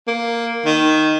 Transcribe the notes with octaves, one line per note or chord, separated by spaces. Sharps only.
A#3
D#3